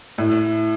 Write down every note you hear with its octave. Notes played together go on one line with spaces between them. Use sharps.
A2